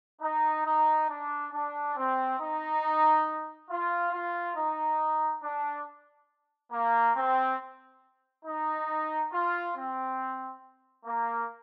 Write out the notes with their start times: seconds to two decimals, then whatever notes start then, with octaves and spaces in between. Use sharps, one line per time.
0.22 D#4
0.65 D#4
1.09 D4
1.53 D4
1.96 C4
2.39 D#4
3.69 F4
4.13 F4
4.55 D#4
5.42 D4
6.71 A#3
7.15 C4
8.46 D#4
9.32 F4
9.75 C4
11.05 A#3